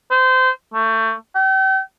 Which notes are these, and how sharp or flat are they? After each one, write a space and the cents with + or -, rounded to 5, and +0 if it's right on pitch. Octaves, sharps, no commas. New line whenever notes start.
C5 -25
A3 +25
G5 -40